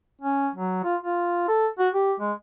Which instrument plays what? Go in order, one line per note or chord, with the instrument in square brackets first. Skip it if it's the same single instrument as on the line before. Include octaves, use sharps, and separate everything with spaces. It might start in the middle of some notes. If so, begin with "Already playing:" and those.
[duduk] C#4
F#3
F4
F4
A4
F#4
G4
G#3